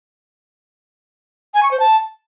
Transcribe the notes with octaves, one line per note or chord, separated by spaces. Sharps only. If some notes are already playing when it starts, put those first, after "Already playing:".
G#5
C#6
C5
A5